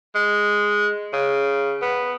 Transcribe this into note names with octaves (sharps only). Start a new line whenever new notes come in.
G#3
C#3
B3